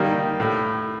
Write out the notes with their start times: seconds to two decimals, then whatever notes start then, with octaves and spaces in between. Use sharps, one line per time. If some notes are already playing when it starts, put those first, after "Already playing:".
Already playing: D#3 G3 A#3
0.40 A2